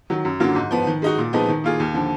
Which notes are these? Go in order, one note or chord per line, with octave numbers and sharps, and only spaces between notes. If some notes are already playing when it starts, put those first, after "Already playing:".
D#3 F#3
F#2
D3 F#3 A#3 F4
G#2
F3 B3
D#3
G#3 D#4 F#4
A#2
F3 G#3 B3 D#4
D#3
A#3 F4 G#4
D#2
D3 F3